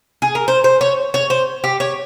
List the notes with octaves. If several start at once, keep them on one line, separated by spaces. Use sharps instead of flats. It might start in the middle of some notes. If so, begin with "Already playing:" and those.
G#4
A#4
C5
C5
C#5
C#5
C5
G4
C#5